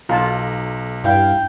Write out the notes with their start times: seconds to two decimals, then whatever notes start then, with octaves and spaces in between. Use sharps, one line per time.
0.09 B1 F4 A5 A#5
1.04 G2 E4 F5 G5